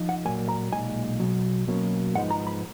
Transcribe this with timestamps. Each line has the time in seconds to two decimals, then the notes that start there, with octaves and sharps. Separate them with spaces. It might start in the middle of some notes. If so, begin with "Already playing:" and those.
Already playing: F3 D#4
0.09 F#5
0.25 A#2 F#3 A#3 G#5
0.49 A#5
0.72 B1 A#2 G#3 D#4 G#5
1.20 B1 B2 F#3
1.68 B2 F#3 A#3 C#4
2.14 G#2 F3 G#3 B3 D#4 F#5
2.31 A#5
2.47 B5